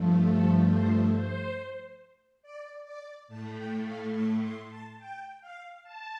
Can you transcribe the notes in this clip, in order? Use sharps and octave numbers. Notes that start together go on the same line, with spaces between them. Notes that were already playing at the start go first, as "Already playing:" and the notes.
Already playing: G2 F3 A3
A4
C5
C5
D5
D5
A2 A3 A5
G5
F5
A5
C6
A5
G5
F5
A5